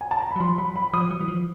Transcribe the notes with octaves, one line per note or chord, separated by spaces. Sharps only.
G#5
A5
A#5
B5
F#3
F3 C6
F#3 B5
B5
F3 D#6
F#3
E3
F3